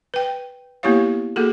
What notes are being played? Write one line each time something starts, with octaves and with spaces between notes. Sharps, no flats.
B4 G5
A#3 B3 E4 G4 C#5 F5
A#3 F#4 G#4 A4